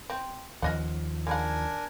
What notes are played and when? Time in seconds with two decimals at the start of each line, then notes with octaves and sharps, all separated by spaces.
0.10 C4
0.62 D#2 F3 C#4 D#5 F#5
1.27 G#3 D4 E4 A#4 F#5 G#5